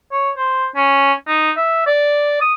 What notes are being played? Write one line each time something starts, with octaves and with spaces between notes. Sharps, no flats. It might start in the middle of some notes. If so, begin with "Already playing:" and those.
C#5
C5
C#4
D#4
E5
D5
D#6